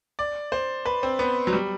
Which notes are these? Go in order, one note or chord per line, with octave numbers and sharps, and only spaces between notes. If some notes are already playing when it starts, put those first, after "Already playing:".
D5
C5
B4
C4
B3
F#3
G3